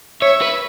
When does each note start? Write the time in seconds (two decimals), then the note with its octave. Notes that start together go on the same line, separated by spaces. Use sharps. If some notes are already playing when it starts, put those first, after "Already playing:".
0.22 C#5 E5
0.42 B4